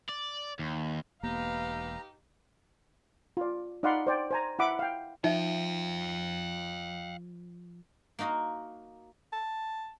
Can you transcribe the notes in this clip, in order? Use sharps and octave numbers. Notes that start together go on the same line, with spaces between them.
D5
D#2
E1 A#3 B3 D#4 G4 B4 F5 A#5
F4 D5
D#4 D5 F5 F#5 B5 C6
C5 D5 G5
C5 G#5 A#5
E4 E5 F#5 B5 D6
F5 G5
F3 D#4 E5 F5 G5
A#3 D#4 F#4 D#5 F5
A5